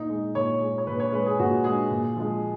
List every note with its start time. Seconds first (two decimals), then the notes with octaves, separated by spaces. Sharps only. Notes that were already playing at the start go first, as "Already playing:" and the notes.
Already playing: A#2 D#4
0.09 G#3
0.35 A#2 C#5
0.61 G#3
0.78 C#5
0.87 A#2 B4
1.00 C#5
1.12 G#3 B4
1.26 G#4
1.39 A#2 F#4
1.64 G#3 G#4
1.91 A#2
2.16 F3 G#3